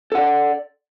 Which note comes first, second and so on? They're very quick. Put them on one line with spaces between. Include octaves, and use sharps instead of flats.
A4 F#5 D5